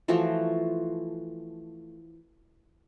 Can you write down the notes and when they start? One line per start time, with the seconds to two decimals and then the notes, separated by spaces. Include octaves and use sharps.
0.08 E3 F3 A3 F#4